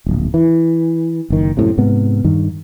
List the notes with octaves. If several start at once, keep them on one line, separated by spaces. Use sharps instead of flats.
D1 A#1
E3
F#1 D#3
F#2 A2 C3
G#2 C3 B3
G2 D#3